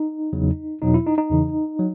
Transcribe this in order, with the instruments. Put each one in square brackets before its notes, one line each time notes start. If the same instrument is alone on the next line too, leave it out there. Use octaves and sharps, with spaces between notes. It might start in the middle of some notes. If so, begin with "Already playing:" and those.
Already playing: [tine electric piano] D#4
E2 C#3 F#3
E2 B2 F#3 D#4
E4
D#4
D#4
E2 C#3 E3
F#3